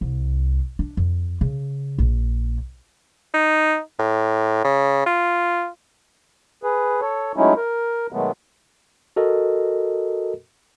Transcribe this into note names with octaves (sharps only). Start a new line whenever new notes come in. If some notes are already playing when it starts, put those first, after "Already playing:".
C2
D4
F2
C#3
A#1
D#4
A2
C#3
F4
G#4 B4
A4 C#5
F#3 G#3 A3 C#4 D#4 E4
A#4
B2 D#3 F#3 G#3 A3 B3
F#4 A4 A#4 D#5